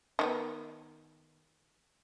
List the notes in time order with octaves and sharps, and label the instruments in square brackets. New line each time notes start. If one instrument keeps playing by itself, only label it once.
[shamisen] D#3 A#3 B3